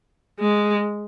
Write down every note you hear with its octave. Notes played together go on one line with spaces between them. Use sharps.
G#3